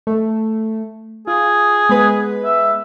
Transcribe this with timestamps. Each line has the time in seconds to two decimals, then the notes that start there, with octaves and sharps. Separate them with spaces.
0.07 A3
1.27 F4 G#4
1.89 G#3 B3 B4
2.45 E5